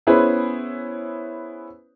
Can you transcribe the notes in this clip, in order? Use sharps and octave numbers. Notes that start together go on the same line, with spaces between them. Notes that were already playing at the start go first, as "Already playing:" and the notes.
B3 C#4 E4 G#4 B4 C5